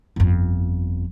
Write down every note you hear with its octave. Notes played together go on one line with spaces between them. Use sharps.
G1 F2